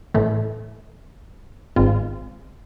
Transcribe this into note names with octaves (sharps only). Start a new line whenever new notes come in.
A1 A2 E3 A3
G#1 G#2 G#3 C4 F4